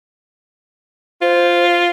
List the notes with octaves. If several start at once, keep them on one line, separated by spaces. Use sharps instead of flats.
F4 C5